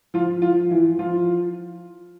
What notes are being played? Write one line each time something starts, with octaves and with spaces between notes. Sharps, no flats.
F3 F4
F3 F4
E3 E4
F3 F4